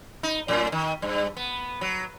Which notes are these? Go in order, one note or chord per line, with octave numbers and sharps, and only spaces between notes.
D#4
F#2 A2
D#3
G2
B3
F#3